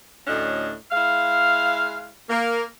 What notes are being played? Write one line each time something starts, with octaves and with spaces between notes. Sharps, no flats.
D2 A2 C#4 D4 D#5
G#3 E4 F5
A#3